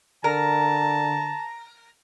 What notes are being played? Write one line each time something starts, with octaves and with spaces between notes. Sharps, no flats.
D3 A#4 A5 A#5